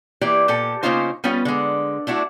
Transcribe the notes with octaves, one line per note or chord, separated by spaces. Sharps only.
E3 A#3 G4 D5
A#2 G4 A4
C#3 A#3 C#4 D#4 F4 C5
G3 B3 C#4 F4
D3 G#3
A3 D4 E4 F#4